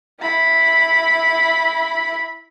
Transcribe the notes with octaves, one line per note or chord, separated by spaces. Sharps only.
E4 B5